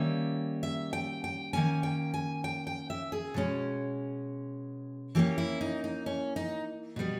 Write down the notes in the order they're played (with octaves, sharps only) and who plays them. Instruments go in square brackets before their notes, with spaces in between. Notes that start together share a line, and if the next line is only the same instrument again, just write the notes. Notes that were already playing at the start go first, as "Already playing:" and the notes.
Already playing: [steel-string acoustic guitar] D#3 G3 A#3 C#4 E5
E5
G5
G5
D#3 A#3 C#4 G#5
G5
G#5
G5
G5
E5
G#4
B2 G#3 C#4
E3 A#3 C#4 G4
E4
D#4
D#4
C#4
D#4
B2 G3 B3